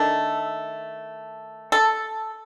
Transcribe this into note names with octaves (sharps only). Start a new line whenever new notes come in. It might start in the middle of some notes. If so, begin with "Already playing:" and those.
Already playing: D#3 A3 D4 A4
A4